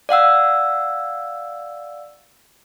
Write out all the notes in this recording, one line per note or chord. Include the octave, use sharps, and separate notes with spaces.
D5 F5 F#5 E6